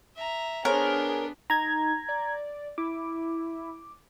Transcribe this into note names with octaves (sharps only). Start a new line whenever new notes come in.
E5 A#5
B3 D4 G#4 A#4 C5 C#5
D#4 A#5 G#6
D5
E4 D6